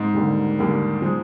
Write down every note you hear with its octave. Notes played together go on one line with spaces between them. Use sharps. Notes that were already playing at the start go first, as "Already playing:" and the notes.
Already playing: G#2
D#2 D3 G3 A#3
D#2 D3 G3 A#3
F3 G#3